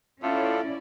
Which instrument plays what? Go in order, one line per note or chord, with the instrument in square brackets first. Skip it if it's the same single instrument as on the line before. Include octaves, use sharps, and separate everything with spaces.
[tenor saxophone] A2 [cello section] C#4 E4 D5 [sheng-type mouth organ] F4 A4